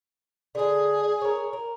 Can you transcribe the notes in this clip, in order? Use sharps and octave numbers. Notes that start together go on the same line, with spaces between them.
D3 G#4 G#5
A#4 C#5
A#4